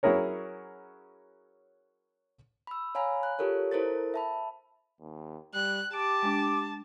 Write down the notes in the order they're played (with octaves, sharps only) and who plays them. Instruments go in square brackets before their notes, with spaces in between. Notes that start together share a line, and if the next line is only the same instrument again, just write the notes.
[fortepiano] F#3 C#4 E4 G#4 A#4 C#5
[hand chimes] B5 E6
C#5 F5 G#5 A#5 B5
F#6
F4 G4 A4 A#4 C#5
E4 A4 A#4 C5 A6
E5 A5 B5
[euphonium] D#2
[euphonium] G3 [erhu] F#6
[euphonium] G4 [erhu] A5 [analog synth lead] D6
[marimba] G#3 D4